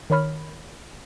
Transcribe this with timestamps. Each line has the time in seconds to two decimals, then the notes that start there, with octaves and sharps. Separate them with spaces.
0.10 D#3 A#4 C#5 B5 F6